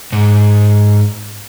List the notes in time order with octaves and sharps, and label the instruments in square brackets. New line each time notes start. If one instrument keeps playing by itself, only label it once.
[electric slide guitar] G#2